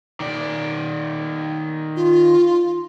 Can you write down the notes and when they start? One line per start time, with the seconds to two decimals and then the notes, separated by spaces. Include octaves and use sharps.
0.20 D#3 D5
1.96 F4